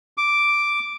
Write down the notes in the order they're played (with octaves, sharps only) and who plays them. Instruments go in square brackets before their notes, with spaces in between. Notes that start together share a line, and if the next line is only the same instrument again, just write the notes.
[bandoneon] D6